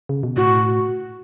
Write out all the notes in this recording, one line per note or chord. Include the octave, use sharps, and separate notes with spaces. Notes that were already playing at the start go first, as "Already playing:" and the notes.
C#3
B2
A2 F#4